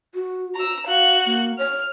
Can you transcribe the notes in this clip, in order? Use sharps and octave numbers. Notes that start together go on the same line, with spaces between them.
F#4
A#5 E6
F#4 F5 F#6
A#3
C#5 F6